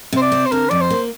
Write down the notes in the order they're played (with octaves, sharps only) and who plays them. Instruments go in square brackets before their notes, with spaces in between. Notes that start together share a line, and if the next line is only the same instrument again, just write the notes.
[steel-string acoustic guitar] C3 [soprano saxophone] C5
[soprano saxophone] D5
[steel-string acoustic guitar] C4
[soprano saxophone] C5
[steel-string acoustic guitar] D3 [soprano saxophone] A#4
[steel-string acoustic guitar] F2 [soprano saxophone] D5
[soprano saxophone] C5
[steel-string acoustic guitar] A#3